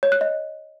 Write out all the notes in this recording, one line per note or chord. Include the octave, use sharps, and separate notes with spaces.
C#5
F#6
D#5